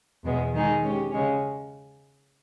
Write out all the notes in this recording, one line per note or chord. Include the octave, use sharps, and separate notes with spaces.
E2 B2 G#3 B3
D#3 G#3 D#4 G#4
G#3 C#4 G4
C#3 G#3 C#4